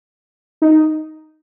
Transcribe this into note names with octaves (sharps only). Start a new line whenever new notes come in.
D#4